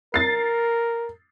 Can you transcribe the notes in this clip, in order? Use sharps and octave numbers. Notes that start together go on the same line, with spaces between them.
A#4 A6 C7